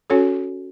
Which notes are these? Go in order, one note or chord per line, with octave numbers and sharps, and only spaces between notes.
C#4 F#4 A4 C#5